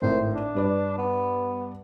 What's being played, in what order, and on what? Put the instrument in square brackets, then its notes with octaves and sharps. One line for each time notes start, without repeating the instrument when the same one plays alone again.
[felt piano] G#1 A2 A#4 [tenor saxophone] C5
[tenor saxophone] D4
[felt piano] G2 B4 D5
[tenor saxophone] B3